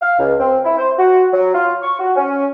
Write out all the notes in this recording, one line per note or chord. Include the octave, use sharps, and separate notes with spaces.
F5
C#2
C4
E4
C5
F#4
F#3
F4
C#6
F#4
C#4